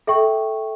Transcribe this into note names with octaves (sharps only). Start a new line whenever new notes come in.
A4 E5 G5 C#6